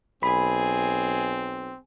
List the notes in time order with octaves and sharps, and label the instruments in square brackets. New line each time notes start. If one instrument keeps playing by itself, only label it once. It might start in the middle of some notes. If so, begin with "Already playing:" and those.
[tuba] B1 [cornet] C4 [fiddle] G#4 [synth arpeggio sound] B5